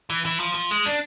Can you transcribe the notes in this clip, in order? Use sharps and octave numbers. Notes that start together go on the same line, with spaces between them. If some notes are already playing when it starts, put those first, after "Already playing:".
E3
E3
F3
F3
G#3
D4